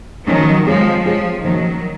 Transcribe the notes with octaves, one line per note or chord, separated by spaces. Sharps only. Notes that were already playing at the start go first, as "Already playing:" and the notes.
D#3 F3 F#3 A#3 C#4
F3 G#3 C4 F4 G#4 C#5
F3 C4 F4 G#4 C#5
C3 D#3 F3 F#3 A#3 C#4